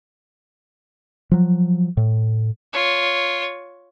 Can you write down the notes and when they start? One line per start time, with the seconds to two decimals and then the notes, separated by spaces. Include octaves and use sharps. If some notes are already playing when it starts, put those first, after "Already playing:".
1.31 F3 F#3
1.97 A2
2.73 F4 C#5